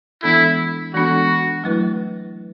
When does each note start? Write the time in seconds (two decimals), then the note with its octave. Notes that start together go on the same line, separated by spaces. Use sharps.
0.23 E3 G#3 B3 D4 E4 A4
0.94 E3 G#3 B3 D4 F#4 A4
1.64 F#3 A3 E4 B4